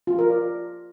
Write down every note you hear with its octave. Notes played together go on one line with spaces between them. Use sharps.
F4
A#4
D5